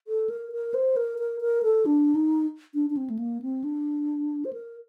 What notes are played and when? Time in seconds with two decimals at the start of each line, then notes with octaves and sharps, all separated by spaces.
0.07 A4
0.30 A#4
0.52 A#4
0.74 C5
0.97 A#4
1.19 A#4
1.41 A#4
1.63 A4
1.86 D4
2.15 D#4
2.74 D4
2.90 D4
2.97 C4
3.10 A3
3.19 A#3
3.42 C4
3.64 D4
4.45 C5
4.53 A#4